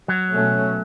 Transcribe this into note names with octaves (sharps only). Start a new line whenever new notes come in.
F#3
B2 A3 C#4